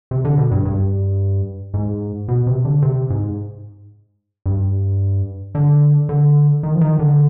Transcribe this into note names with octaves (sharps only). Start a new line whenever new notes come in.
C3
D3
B2
G2
G2
G#2
B2
C3
D3
C3
G#2
G2
D3
D3
D#3
F3
D#3
D3